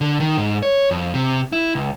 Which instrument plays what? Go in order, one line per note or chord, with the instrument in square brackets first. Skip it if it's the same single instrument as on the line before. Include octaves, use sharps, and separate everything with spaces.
[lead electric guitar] D3
D#3
G#2
C#5
F2
C3
E4
C#2